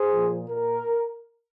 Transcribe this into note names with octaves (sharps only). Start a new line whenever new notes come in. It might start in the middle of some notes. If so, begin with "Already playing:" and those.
Already playing: G#4 C5
A#2 F3
A#2 A#4